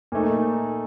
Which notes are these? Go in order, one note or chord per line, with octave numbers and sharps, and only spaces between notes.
A#2 A3 D#4